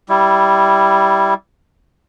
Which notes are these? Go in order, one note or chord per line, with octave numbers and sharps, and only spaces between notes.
G3 E4